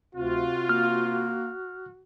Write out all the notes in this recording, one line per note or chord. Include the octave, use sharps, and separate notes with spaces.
D2 C3 F4 F#4
A#3 F6